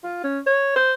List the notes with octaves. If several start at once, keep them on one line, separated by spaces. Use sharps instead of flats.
F4
C#4
C#5
C5